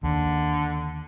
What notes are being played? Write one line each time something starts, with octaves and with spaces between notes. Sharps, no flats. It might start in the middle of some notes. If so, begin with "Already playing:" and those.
D#2 D3